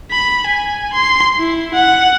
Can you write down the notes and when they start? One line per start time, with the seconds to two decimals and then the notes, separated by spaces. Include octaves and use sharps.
0.11 B5
0.47 G#5
0.93 C6
1.39 E4
1.74 F#5